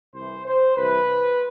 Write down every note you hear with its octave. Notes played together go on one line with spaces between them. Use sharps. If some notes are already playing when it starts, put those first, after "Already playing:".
C2 C3 E3 C5
C5
C2 C3 E3 B4